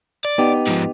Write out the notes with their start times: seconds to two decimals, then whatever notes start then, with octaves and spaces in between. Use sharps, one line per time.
0.25 D5
0.38 B3 D#4 G4
0.67 G#2 F3